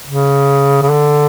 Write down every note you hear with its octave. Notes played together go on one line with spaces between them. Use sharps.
C#3
C#3
D3